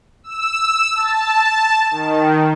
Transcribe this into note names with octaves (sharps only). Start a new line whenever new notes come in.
E6
A5
D#3